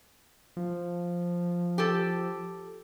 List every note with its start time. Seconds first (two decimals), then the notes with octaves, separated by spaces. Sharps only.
0.57 F3
1.78 G4 A4